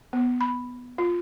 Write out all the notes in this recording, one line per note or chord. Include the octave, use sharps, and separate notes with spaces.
B3
B5
F4